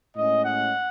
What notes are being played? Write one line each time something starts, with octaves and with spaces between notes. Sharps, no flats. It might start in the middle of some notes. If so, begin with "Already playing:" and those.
A2 G#3 C#4 D#5
F#5